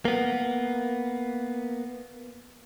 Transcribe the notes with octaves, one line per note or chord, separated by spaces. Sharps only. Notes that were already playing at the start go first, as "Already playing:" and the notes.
A#3 B3